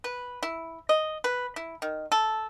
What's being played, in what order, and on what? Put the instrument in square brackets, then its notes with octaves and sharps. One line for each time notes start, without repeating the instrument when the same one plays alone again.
[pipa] B4
E4
D#5
B4
E4
D#3
A4